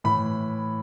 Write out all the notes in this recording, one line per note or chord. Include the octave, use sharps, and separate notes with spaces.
A2 E3 B5